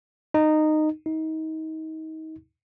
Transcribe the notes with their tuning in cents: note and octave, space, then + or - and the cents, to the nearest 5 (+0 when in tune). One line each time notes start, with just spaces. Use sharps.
D#4 -15
D#4 +30